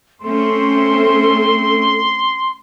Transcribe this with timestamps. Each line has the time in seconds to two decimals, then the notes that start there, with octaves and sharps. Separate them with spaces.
0.22 A3 C4 C#4 A4 C6